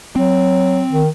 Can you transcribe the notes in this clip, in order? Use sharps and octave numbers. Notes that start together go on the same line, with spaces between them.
F#3 C4
D#3